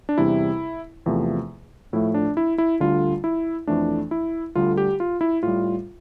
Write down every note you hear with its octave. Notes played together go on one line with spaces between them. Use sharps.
D4
E2 C3 G3 E4
E2 C3 F3 A3
A2 F3 A3 E4
D4
E4
E4
D2 D3 G3 F4
E4
F2 E3 A3 D4
E4
D2 D3 G3 F4
G4
F4
E4
A2 G3 F4